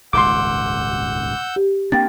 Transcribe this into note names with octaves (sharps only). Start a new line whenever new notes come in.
D#1 G#1 C#2 F#5 C6 D6 E6 G6
G4
A#3 C4 D4 G5 A6